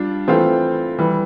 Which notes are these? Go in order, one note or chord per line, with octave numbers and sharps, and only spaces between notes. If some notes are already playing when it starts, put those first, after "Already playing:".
Already playing: G3 D4 F4
E3 A3 C4 F4
E3 G3